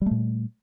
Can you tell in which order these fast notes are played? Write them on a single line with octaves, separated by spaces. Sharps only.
G3 A3 A#2